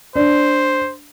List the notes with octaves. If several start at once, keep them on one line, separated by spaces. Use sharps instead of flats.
D4 C5